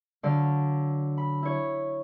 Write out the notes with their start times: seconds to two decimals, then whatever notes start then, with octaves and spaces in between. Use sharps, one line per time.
0.23 D3 F#3 D5 F5
1.17 B5
1.43 E4 C#5